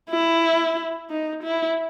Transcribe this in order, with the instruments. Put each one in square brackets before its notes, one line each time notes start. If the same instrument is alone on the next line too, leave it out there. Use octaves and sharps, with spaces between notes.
[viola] E4
D#4
E4